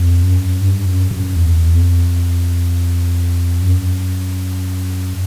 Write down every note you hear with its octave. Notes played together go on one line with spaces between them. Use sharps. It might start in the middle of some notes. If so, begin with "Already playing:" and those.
Already playing: F2
F#2
G2
F#2
F#2
E2
F2
F#2